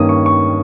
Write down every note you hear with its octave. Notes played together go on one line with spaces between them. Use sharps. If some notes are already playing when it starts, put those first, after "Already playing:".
Already playing: G2 D#3 A#3 C#4 D#6
C#6
C#6